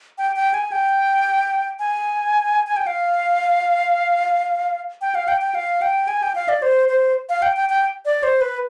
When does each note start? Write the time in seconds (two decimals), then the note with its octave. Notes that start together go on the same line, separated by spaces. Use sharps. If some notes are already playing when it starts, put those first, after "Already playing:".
0.18 G5
0.36 G5
0.54 G#5
0.72 G5
1.79 G#5
2.67 G#5
2.77 G5
2.87 F5
5.01 G5
5.15 F5
5.28 G5
5.41 G5
5.55 F5
5.82 G5
6.08 G#5
6.23 G5
6.35 F5
6.48 D5
6.62 C5
6.89 C5
7.29 F5
7.42 G5
7.56 G5
7.69 G5
8.05 D5
8.23 C5
8.41 B4